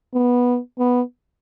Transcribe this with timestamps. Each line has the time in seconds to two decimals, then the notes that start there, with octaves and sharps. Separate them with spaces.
0.14 B3
0.79 B3